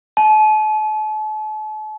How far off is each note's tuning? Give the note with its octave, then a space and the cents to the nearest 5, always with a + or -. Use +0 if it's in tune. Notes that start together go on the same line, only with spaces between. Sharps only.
A5 -40